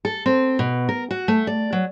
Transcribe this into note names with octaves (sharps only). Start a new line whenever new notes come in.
A4
C4
B2
A#4
F#4
A3
D5
F#3